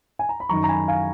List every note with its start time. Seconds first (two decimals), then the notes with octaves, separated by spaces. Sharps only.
0.19 G#5
0.29 A#5
0.40 B5
0.49 F#2 D#3 A#5 C#6
0.64 A#5
0.68 G#5 B5
0.88 F5 G#5